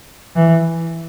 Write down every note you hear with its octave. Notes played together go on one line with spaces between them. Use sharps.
E3